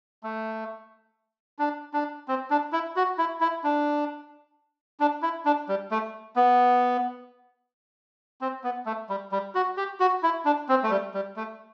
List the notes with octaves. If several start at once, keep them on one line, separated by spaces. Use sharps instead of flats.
A3
D4
D4
C4
D4
E4
F#4
E4
E4
D4
D4
E4
D4
G3
A3
B3
C4
B3
A3
G3
G3
F#4
G4
F#4
E4
D4
C4
A3
G3
G3
A3